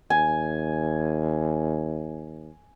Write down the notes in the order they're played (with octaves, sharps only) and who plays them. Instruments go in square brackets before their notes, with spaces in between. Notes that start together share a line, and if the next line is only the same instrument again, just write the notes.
[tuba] D#2 [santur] G#5